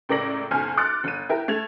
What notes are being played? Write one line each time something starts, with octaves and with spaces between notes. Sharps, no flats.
C#2 A2 A#4 D5 A#6 F#7
F#1 B1 G#5 F6
C6 D6 F6 F#6 A6 C#7
G1 D#7
E4 G4 A#4
A3 G#6 F7